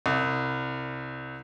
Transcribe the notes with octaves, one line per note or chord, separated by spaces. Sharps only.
C2